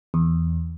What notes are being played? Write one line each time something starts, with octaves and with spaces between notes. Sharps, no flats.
E2